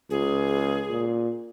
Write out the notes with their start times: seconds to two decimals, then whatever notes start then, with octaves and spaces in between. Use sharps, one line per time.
0.10 C#2 G#4
0.90 A#2